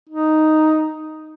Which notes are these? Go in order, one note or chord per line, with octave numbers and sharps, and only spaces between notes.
D#4